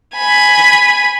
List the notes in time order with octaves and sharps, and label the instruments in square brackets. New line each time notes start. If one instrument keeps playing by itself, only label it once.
[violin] G#5 B5